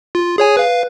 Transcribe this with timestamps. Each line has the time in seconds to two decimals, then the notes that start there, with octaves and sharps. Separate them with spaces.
0.15 F4
0.38 G#4 C#5 G#5
0.57 B4 F5